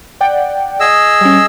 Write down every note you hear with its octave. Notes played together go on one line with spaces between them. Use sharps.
D5 F#5 G5
G#4 D#5 E6
G3 C#4